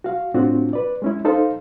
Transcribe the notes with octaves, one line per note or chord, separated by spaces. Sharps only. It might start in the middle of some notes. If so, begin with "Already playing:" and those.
F#4 F5
A2 C4 D4 F4 F#4
B4 D5
G#3 C#4 E4
D#4 A4 C5 F5